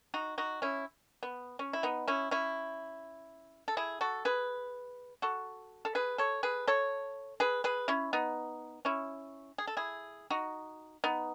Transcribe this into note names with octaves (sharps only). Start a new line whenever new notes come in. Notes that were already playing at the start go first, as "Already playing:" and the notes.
D#4 F#4
D#4 F#4
C#4 E4
B3
C#4
E4
B3 D#4
C#4 E4
C#4 E4
A4
E4 G#4
F#4 A4
G#4 B4
F#4 A4
A4
G#4 B4
A4 C#5
G#4 B4
A4 C#5
G#4 B4
G#4 B4
C#4 E4
B3 D#4
C#4 E4
G#4
A4
E4 G#4
D#4 F#4
B3 D#4